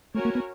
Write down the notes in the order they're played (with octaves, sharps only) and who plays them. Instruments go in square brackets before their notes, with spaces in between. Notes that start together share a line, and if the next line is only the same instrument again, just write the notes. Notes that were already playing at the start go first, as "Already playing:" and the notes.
[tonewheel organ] A3 [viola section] C#4 F#4 A#4 C#5
[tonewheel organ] A#3
B3